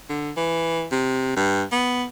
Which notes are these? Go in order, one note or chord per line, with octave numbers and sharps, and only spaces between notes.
D3
E3
C3
G2
B3